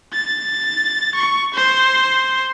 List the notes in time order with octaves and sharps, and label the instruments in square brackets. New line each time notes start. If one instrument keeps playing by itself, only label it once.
[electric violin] A6
C#6
C5